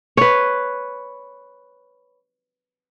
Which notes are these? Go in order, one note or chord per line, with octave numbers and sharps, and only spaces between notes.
B4 C#5